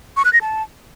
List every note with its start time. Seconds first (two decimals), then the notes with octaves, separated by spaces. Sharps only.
0.17 C#6
0.25 F#6
0.33 A#6
0.41 A5